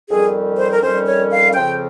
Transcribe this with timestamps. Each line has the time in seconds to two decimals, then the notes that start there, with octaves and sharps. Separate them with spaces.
0.10 F2 D#3 G3 C#4 G#4
0.58 C5
0.71 A#4
0.81 F2 D#3 G3 C#4 C5
1.06 C#5
1.31 F5
1.54 F2 C#3 F3 C4 G5